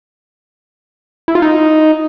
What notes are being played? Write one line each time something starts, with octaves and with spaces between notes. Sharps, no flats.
E4
F4
D#4